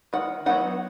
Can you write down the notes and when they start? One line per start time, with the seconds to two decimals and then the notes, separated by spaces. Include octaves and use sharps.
0.13 D#3 F#5
0.46 F#3 B3 D#4 F#5